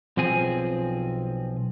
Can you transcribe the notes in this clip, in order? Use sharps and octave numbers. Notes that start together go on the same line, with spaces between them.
B1 F3 C4 G#4 G#5